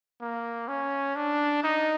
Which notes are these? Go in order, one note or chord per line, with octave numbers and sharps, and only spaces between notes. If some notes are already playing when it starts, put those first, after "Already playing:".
A#3
C#4
D4
D#4